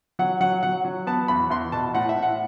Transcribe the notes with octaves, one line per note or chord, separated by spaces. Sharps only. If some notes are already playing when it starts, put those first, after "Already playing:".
F#3 F#5
F#3 F#5
F#3 F#5
F#3
B3 A5
E2 B5
E2 C6
B2 A5
A2 F#5
E5
A2
F#5